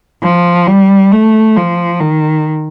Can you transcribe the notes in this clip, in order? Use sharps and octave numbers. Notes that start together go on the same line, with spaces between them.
F3
G3
A3
F3
D#3